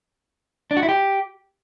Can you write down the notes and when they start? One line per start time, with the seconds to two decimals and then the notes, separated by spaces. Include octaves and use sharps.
0.71 D4
0.77 F#4
0.83 E4
0.89 G4